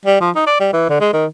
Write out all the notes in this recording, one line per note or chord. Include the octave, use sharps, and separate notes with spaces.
G3
F3
D#4
D5
G3
E3
D3
G#3
D#3